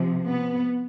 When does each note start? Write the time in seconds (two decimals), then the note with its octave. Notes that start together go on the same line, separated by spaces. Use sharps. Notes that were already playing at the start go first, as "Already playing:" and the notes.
Already playing: C3 F3
0.25 B3